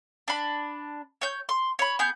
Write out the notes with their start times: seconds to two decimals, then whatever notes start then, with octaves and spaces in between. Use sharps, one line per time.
0.28 D4 B5
1.21 C#5 G6
1.49 C6
1.79 C#5 B5
1.99 B3 G#4 G6